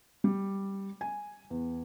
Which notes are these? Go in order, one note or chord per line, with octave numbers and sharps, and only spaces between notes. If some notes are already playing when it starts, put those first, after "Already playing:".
G3
G#5
E2